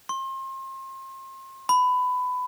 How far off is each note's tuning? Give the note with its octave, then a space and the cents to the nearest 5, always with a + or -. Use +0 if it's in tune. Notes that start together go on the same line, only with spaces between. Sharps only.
C6 +35
B5 +20